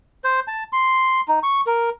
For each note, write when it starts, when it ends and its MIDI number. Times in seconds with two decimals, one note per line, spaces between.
0.24 0.40 72
0.48 0.63 81
0.73 1.21 84
1.28 1.39 63
1.43 1.61 85
1.67 1.90 70